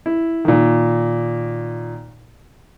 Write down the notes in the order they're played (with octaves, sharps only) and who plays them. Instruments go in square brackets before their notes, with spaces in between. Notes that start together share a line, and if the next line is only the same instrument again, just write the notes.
[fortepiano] E4
A#2 D#3